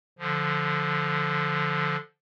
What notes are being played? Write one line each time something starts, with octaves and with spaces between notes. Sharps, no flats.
D3 F3